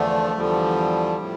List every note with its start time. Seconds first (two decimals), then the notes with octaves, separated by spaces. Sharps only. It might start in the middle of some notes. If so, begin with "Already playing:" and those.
Already playing: E2 D3 F3 A3
0.36 E2 D3 F3 G3
1.18 A2 F3